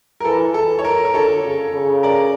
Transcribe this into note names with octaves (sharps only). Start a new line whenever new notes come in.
A#4
E3 A4
A4
C#5
A#4
A#4
D3 A4 C#5
C#3
C#3
A#4 D5